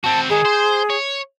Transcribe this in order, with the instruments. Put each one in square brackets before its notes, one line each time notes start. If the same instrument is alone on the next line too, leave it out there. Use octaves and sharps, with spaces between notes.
[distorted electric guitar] C4 F#4 [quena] A5
[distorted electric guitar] D#3 G#3 [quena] G#4
[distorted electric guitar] C5
C#5